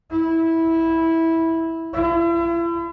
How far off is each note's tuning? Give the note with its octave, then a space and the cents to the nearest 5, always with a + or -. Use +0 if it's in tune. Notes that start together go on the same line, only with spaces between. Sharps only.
E4 -10
E4 +40